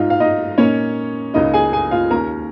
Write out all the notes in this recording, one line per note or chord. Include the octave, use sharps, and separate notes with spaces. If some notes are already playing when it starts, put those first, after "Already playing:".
Already playing: G#2 G#3 D#4 F4 F5
F5
D#4 D#5
A#2 A#3 C#4 D#4 C#5
C#2 C#3 A#3 D#4 D#5
G#4 G#5
G#4 G#5
F4 F5
D#2 D#3 C#4 A#4 A#5